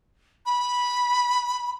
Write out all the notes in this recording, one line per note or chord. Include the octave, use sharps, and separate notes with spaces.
B5